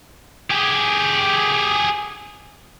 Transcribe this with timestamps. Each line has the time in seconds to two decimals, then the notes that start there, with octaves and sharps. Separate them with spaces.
0.51 G4 G#4